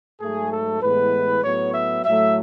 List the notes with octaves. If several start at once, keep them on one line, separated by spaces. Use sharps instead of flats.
G#2 F#3 A3 G#4
A4
A2 E3 G#3 B3 B4
A2 F#3 B3 C#5
E5
A2 F#3 A3 E5